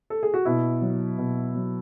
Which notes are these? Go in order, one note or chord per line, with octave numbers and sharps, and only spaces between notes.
A4
G#4
F#4
B2 E4
F#3
B2
F#3